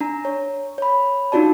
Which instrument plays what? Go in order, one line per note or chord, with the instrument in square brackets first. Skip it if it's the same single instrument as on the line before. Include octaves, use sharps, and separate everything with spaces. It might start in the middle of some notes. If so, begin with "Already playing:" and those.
[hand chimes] D4 A#5
C#5
C#5 B5
D4 D#4 F4 F#4 D5 A5